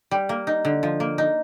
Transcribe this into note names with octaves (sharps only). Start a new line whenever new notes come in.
G3
A#3
D#4
D3
F3
A#3
D#4